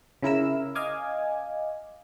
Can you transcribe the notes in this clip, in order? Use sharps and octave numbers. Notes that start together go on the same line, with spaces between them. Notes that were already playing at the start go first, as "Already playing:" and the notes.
C#3 E4 A#4 E6
D#5 F5 G#5 D6